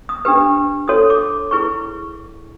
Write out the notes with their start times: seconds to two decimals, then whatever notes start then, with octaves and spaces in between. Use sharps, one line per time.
0.09 D#6
0.25 D4 G4 B4
0.88 F#4 A4 C#5 D#6
1.10 D6
1.51 E4 G#4 B4 C#6